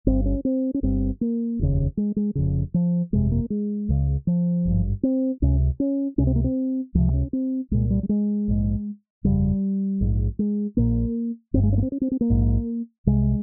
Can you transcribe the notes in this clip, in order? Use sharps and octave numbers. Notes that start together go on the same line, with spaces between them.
G1 G2 C4
C#4
C4
C#4
G1 G2 C4
A#3
F1 D#2 C#3
G#3
G#3
F1 F2 C#3
F3
G1 F2 C3 G#3
A#3
G#3
C#2 C#3
F3
G#1 G2
C4
C#2 C3 C#4
C#4
C#2 C3 C#4
C4
A#3
C4
C#2 C3 F3
C#4
C4
C2 A#2 G#3
G3
G3
G#3
A#1 G#2
G1 F2 C#3 G3
A#1 G#2
G#3
A#1 A#2 A#3
G1 G2 C4
G#3
C#4
A#3
C4
C#4
C4
C4
A#3
A#1 G#2
C2 C3 G#3